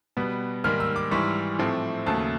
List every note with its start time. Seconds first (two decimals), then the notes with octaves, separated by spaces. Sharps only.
0.17 B2 G3 B3
0.64 G#2 D#3 G3 A#3 F6
0.80 E6
0.96 D6
1.11 G#2 E3 G3 C#6
1.59 A2 F3 A3 C4
2.06 D#2 C#3 F#3 A3 A5